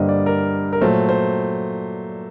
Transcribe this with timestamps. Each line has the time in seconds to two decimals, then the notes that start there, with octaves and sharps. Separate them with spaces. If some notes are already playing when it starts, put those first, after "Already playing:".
Already playing: G2 D3 G3 A#3 C5 D#5
0.09 D5
0.26 A#4
0.73 A#4
0.81 A#2 F#3 A3 C5
1.09 C5